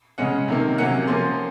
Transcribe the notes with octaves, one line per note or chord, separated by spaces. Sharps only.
C#3 G#3 C#4 F#5
C3 D#3 A#3
C3 F#3 A#3 C#4 F#5
F3 A#3 C#4 C6